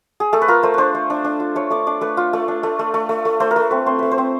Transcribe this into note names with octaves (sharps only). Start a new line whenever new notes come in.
G#4
A3 A4
B4
F4 A#4
A3 C5
D4 B4 C5
A3
D4
D4
F4
A3 C#5
A3 D5
D4 D5
A3 B4
F4
A3
D4
A3
A3
A3
A3
A3
A3 C5
A#4
A3 B4
C4 B4
C4 C5
A3 B4
C5
C4